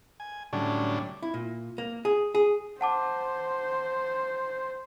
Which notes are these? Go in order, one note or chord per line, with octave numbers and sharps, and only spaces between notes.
G#5
A2 D3 F#3 G3 C#4 D4
E4
A#2
A#3
G#4
G#4
C5 F#5 A5 D6